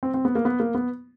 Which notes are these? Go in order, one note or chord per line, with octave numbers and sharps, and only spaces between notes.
C4
C4
B3
A#3
B3
A#3
B3